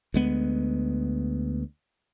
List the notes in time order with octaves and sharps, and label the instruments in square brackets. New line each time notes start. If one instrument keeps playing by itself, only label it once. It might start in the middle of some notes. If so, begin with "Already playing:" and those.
[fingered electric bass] D2 G#3 B3